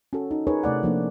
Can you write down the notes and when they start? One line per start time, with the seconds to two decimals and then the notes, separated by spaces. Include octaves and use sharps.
0.13 C#4 F#4 A4
0.31 D#4
0.47 D#4 F4 G#4 A#4 B4 C#5
0.64 C3 A3 D5 F#5
0.83 F3 A#3 D4